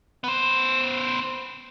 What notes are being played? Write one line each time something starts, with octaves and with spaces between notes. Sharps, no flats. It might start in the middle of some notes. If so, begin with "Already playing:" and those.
B3 C5